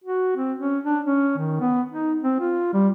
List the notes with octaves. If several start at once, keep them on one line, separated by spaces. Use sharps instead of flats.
F#4
C4
C#4
D4
C#4
D#3
B3
D#4
C4
F4
G3